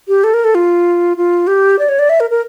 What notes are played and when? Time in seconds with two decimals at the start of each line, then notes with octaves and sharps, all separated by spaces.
0.08 G4
0.24 A4
0.34 A#4
0.44 A4
0.55 F4
1.17 F4
1.47 G4
1.79 D5
1.89 C#5
1.99 D5
2.09 E5
2.20 A#4
2.30 A#4